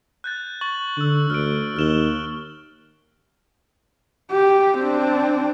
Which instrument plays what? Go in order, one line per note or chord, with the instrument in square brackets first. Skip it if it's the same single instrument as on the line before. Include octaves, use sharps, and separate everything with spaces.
[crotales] F#6 G6 A6
C#6 A6 F#7
[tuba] D3 [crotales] C#6 E6
[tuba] D2 [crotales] F6 D7
[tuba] D#2 [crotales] F6 E7 G7
[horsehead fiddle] G4
C4 D4